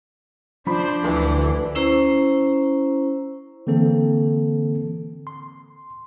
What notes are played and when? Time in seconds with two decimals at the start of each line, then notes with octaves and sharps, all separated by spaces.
0.67 F3 D4 C5 B5
1.04 D2 E3
1.75 C#4 E4 C5 A#5
3.67 D3 E3 A#3 C4 A4
5.27 C6